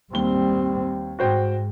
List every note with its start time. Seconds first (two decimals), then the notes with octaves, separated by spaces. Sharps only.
0.13 D#2 G3 C4 G7
1.19 G#2 F#4 C5 G5